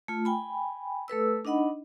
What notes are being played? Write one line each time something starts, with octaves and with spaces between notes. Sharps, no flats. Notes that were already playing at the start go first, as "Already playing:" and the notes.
A3 F4
G5 G#5 B5
A3 A4 B4 E6
D4 D#4 D#5 F#5 B5